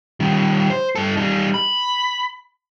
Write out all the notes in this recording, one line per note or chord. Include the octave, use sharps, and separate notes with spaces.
D#3 G3
C5
G2 A4
G3 D#4
B5